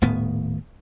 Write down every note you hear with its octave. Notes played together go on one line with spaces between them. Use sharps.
D#1 A2 D#3 B3